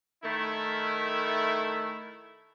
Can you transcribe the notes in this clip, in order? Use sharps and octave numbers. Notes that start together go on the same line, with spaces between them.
D#3 A3 E4